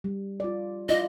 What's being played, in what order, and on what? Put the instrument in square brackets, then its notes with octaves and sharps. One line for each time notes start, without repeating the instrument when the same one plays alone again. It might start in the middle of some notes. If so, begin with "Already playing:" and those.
[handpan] G3
F4 D5
[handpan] E4 F4 D5 [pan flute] D#5